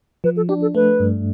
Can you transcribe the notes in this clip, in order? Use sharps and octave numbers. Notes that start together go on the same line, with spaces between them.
F3 B4
A4
D4 G4
A4
A3 B4
G2